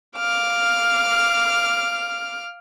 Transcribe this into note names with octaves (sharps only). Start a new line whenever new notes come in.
F5 D6 F6